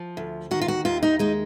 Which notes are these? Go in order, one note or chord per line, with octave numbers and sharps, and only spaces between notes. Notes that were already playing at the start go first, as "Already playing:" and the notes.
Already playing: F3
D2
D#3 F#4
F4
F#4
D#2 F4
D#4
G#3 D#4